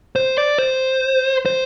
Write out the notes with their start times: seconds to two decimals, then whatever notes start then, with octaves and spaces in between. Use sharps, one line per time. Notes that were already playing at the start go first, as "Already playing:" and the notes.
0.16 C5
0.38 D5
0.58 C5
1.46 C5